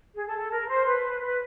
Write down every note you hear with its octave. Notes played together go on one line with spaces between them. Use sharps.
G#4
A4
A4
A#4
C5
B4
B4